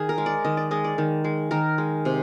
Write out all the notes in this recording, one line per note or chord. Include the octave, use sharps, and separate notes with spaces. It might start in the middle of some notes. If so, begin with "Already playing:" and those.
Already playing: D#3 G#4
A#4
G#3
D5
D#3 D#5
D5
G#3 D#5
D5
D#3
G#3
D#3 A#4
G#3
C3